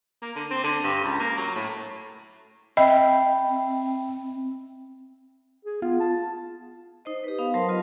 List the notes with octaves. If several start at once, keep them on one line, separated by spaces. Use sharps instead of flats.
A#3
D3
C4
D3
G2
C#2
A#3
F#3
A2
C4 D#5 E5 G5 B5
G#4
B3 F4
A5
D#4 C5 D#5
G4 B4
B3 F5 D#6
F#3 A#4 C5 A5 C6
F4 A#4 D#5